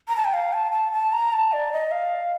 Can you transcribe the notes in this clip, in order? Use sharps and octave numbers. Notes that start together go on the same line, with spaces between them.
A#5
A5
G5
F5
A5
A5
A5
A#5
A5
D5
D#5
F5